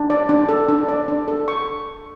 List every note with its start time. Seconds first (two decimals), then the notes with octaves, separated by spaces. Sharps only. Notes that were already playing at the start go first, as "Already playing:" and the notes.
Already playing: D4
0.10 D5
0.29 D4
0.49 A4
0.69 D4
0.88 D5
1.08 D4
1.28 A4
1.48 C#6